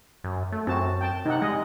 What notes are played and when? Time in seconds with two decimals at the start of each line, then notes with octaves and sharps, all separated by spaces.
0.24 F#2
0.52 A3
0.67 F#2 C4 F#4 A5
1.01 G5 A5
1.25 C3 D#4 F#5
1.42 G3 G#3 D#5